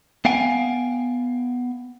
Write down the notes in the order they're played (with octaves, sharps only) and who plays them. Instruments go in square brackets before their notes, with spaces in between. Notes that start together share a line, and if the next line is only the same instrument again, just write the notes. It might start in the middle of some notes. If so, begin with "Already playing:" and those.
[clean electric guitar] B3 F5 G5 G#5